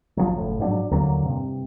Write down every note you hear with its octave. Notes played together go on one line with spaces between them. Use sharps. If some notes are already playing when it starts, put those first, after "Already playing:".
A#1 F3 F#3
F#1 A2
G#2 F3 F#3 D4
D#2 D3 F#3 A#3
G2 C3